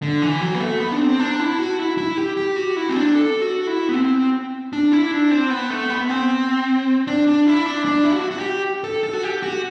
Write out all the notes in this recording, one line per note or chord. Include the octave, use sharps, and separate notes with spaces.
D3
E3
F#3
B3
A3
B3
D4
C4
D4
E4
F#4
E4
E4
G4
G4
F#4
E4
C4
D4
A4
F#4
E4
B3
C4
D4
E4
D4
C4
B3
A3
B3
C4
D4
D4
E4
D4
D4
E4
F#4
F#4
G4
A4
A4
F#4
G4
F#4